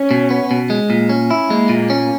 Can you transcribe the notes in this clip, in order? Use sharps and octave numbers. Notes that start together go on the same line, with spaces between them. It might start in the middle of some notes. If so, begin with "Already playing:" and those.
Already playing: C#4
B2
B3
B2
G#3
A#2
C#4
E4
G#3 A#3
A#2
C#4